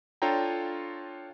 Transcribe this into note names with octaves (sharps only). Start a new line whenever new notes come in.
D4 F4 A4 C#5 G5 A#5